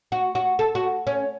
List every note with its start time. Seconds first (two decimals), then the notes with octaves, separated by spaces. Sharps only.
0.12 F#4
0.35 F#4
0.59 A4
0.75 F#4
1.07 C#4